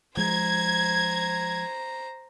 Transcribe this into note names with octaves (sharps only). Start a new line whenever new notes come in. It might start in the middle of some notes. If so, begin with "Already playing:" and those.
F3 G#3 C5 A#5 G#6